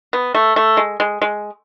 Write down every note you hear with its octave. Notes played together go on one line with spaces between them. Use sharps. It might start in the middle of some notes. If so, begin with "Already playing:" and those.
B3
A3
A3
G#3
G#3
G#3